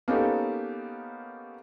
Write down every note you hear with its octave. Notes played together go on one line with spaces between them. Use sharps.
A#3 B3 C#4 D#4 G4 A4